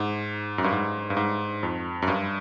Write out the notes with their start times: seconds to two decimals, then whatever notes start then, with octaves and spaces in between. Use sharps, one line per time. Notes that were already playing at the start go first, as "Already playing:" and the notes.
Already playing: G#2
0.58 F#2
0.64 G2
0.72 G#2
1.10 G2
1.17 G#2
1.63 F2
2.02 F#2
2.08 G2